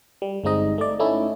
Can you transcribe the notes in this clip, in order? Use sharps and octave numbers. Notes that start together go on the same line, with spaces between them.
G3
G1 G#3 C4 D#4 D#5
A3 D5
A3 C#4 D#4 E4